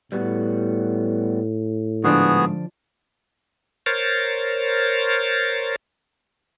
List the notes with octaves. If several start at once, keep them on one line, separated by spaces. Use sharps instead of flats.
A2 G3 B3 F#4
G#2 D3 F3 B3 D4 F#4 G#4
A#4 C5 C#5 A6